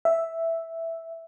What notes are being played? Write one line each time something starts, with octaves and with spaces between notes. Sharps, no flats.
E5